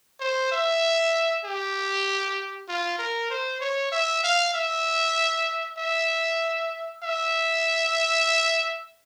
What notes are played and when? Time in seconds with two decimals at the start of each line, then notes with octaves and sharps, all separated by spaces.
0.20 C5
0.52 E5
1.45 G4
2.69 F4
2.99 A#4
3.30 C5
3.61 C#5
3.92 E5
4.24 F5
4.54 E5
5.78 E5
7.03 E5